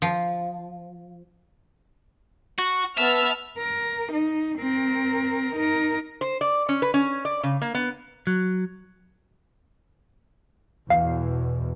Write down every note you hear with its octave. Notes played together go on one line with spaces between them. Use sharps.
F3
F#4
B3 E5 A5 F6
A#4
D#4
C4 A#4
D#4 A#4
C5
D5
C#4
B4
C#4
D5
C#3
A#3
B3
F#3
E2 B2 F5